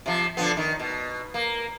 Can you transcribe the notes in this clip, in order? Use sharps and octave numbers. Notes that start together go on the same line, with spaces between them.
C3 F3
D3 F3 B3
D#3
B2
A#3